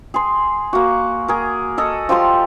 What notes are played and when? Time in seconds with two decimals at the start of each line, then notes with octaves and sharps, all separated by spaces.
0.14 G#4 C6
0.73 A#3 F#4
1.28 G#4 A#4
1.78 A4 D#5 F#5
2.09 F3 G4 D5 C6